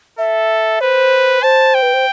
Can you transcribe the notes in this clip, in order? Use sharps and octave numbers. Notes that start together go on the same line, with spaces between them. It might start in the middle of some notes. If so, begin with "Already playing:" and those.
A4 E5
B4 C5
C5 A5
G5
B4
C5